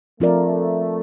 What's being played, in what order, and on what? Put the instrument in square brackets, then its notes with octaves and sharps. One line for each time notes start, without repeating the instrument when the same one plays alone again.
[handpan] F3 C4 F4 A#4 D5 [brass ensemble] A3